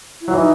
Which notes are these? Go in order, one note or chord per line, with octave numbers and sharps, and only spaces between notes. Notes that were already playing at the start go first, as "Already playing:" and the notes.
E4
F#3
E3 D#4